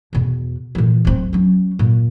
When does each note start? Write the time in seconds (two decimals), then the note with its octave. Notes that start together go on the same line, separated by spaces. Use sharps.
0.13 E2 B2
0.75 A#2 E3
1.05 D1 C4
1.33 F#3 C#4
1.79 A#2